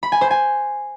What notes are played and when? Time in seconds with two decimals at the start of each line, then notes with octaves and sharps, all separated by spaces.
0.03 B5
0.12 G#5
0.21 C5
0.31 G#5